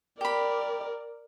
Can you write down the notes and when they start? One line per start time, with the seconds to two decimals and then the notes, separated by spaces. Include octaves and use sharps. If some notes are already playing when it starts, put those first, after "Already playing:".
0.21 G4 A#4 D5 B5